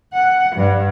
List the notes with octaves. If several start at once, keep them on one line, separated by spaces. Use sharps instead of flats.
F#5
G2